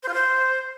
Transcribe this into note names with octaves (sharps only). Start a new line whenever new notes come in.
C5
F4
C5